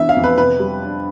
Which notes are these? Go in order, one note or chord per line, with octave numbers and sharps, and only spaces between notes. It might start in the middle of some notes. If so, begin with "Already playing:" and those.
Already playing: E3 B3 D4 E5
F5
F2
B4
C3 B4
G3
D4